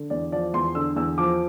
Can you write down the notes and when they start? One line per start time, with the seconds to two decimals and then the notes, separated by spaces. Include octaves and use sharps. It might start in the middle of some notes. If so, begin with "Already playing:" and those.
Already playing: D3
0.10 E2 D5
0.32 F3 D5
0.54 E2 C6
0.75 D3 E6
0.96 E2 E6
1.18 F3 D6